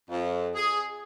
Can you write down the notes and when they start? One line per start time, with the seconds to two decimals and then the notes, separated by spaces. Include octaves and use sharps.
0.10 F2
0.55 G#4